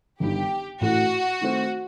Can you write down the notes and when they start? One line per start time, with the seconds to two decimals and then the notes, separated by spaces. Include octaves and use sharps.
0.20 G1 G2 D#3 G4
0.81 A1 A2 E3 A3 F#4
1.41 D#3 A3 C4